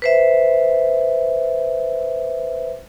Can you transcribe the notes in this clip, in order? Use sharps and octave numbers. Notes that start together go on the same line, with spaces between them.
B4 C5 E5